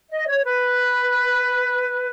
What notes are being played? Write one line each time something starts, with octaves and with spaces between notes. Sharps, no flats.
D#5
C#5
B4